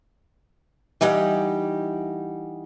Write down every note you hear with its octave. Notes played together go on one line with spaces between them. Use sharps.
E3 G3 D#4 G4 F#5